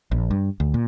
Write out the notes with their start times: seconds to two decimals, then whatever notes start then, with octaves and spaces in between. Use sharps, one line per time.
0.11 A#1
0.31 G2
0.60 D2
0.74 A#2